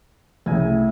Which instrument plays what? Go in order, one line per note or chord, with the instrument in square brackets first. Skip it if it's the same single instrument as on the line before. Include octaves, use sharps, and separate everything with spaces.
[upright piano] C2 C#3 [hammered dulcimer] A2 G#5